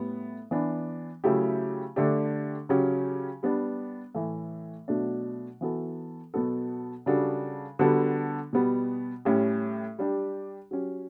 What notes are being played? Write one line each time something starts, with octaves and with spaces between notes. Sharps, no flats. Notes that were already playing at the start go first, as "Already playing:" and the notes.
Already playing: A2 G3 B3
E3 B3 D4
C#3 F#3 A3 E4 G4
D3 A3 D4 G4
C#3 F#3 C#4 G4
G3 B3 D4
A2 E3 A3
B2 F#3 A3 D4
E3 B3 F#4 A4
B2 F#3 B3 F#4 A4
C#3 G3 D4 F#4 A4
D3 G3 B3 F#4 A4
B2 G3 B3
A2 G3 C#4 G4
G3 D4 G4
F#3 C#4 G4